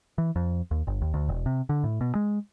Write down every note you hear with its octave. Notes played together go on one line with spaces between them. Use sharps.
E3
F2
D#2
G1
D#2
D2
E1
C3
D3
A2
B2
G#3